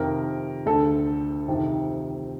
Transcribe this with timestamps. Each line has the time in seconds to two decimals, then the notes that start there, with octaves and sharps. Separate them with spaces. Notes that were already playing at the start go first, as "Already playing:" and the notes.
Already playing: F2 C3 D#3 A#4
0.66 D2 D3 A4
1.48 F2 C3 D#3